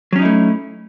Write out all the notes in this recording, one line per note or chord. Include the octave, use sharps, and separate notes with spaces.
F#3 A3 C#4 D#4 E4